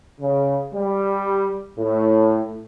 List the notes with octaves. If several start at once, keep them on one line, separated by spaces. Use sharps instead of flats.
C#3
G3
A2